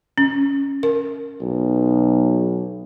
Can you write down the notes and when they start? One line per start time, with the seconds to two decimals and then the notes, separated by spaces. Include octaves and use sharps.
0.18 C#4
0.83 A#4
1.41 B1